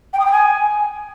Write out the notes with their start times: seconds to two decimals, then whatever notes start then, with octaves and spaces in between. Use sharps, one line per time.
0.13 G5
0.19 D#6
0.25 G5
0.31 G#5